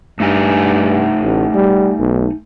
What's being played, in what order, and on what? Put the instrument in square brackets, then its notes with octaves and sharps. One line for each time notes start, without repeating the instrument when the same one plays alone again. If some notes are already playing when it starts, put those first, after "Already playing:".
[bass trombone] G2 [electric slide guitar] A3 D#4 G#5
[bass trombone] A1
G3
B1